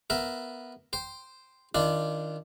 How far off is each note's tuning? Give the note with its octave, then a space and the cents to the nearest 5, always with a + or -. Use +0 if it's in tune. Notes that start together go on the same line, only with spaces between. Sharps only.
B3 +0 A#4 +0 E5 +10
C5 +0 G5 +0
D#3 +0 D4 +0 F4 -30